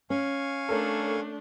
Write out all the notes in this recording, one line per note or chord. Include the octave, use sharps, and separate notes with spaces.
C#4 F5 G#5 C#6
A3 D4 A4 A#4 C#5